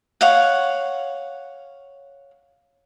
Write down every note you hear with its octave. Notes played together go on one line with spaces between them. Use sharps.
C#5 F5 F#5